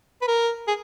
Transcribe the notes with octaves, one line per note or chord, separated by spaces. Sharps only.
B4
A#4
G#4